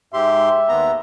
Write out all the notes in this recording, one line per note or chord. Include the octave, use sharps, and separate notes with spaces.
G#2 G4 E5 C6
D#2 B3 A#5